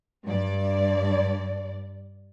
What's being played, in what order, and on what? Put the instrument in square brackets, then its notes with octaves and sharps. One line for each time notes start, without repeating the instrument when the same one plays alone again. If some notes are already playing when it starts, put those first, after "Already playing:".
[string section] G2 D5